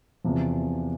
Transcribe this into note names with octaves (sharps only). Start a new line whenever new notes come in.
E2 C3 F3